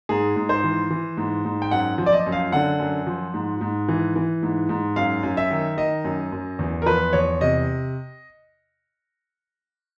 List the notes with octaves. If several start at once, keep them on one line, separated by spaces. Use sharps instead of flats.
G#2 G#4
G#2
C5
E3
E3
G#2
G#2
G5
F#2 F#5
F3
D5
D#5
F#2
F5
D3 F#5
F#2
F3
G#2
G#2
E3
E3
G#2
G#2
F#2 F5
F#2
E5
D#3
D#3 D#5
F#2
F#2
E2
A#4
F3 B4
E2 C#5
C3 D#5